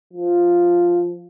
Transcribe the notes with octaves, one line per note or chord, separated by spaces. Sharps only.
F3